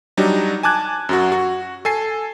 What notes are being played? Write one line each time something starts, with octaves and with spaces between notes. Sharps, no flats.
F#3 G3 D4 D#4
G#5 A5 D6 F#6 G#6
F#2 F#3 F#4
F#4
A4 G#5 C7